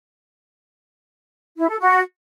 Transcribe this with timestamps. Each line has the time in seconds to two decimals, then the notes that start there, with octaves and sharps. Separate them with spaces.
1.57 E4
1.69 A4
1.80 F#4